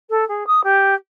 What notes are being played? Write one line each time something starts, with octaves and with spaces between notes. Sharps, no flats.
A4
G#4
D#6
G4